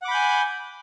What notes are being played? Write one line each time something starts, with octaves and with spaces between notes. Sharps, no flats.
F#5 G#5 B5 D6 G6